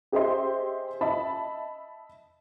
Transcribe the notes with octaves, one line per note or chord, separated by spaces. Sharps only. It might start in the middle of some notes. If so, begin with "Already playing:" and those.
G4 G#4 C5 D#5 E5 C6
D#5 E5 A5 B5